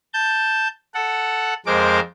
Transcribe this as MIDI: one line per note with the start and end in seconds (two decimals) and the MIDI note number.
0.14 0.68 81
0.14 0.68 91
0.94 1.54 69
0.94 1.54 78
1.66 2.00 41
1.66 2.00 56
1.66 2.00 70
1.66 2.00 72
1.66 2.00 86